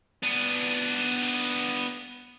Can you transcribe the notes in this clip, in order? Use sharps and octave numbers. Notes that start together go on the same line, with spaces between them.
B3 D4